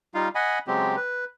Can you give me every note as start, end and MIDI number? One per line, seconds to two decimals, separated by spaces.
0.14 0.28 55
0.14 0.28 63
0.14 0.28 65
0.14 0.28 77
0.35 0.59 75
0.35 0.59 78
0.35 0.59 80
0.35 0.59 83
0.67 0.96 49
0.67 0.96 54
0.67 0.96 56
0.67 0.96 60
0.67 0.96 67
0.96 1.25 71